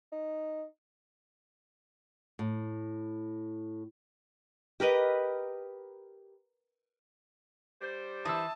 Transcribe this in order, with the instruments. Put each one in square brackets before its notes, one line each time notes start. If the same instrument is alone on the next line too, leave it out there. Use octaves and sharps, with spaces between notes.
[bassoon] D#4
[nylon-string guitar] A2
[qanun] G4 A#4 B4 D#5
[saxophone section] G3 D4 C5
[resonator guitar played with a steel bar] E3 [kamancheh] A5 [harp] D#6 E6